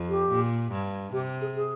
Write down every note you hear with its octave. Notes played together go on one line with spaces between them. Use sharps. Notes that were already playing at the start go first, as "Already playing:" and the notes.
Already playing: F2
G4
A#2
G2
C3 G4
G#4
G#4